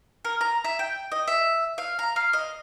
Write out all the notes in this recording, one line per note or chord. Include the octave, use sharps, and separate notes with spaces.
A#4
A#5
E5
G5
D#5
E5
F5
A#5
F5
D#5